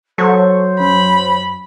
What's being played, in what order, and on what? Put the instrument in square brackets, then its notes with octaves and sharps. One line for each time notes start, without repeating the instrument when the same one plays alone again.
[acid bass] F#3 [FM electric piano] A4 C#6 [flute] C5
[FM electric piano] F#2 [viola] B5